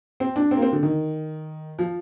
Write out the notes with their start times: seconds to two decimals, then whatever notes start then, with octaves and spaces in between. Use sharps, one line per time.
0.20 C4
0.36 D4
0.51 C4
0.57 A#3
0.62 C4
0.73 D3
0.83 D#3
1.79 F3